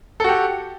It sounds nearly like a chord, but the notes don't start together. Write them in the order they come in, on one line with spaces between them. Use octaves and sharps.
A4 F#4 G4